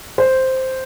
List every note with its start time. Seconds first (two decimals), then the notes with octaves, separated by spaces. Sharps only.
0.18 C5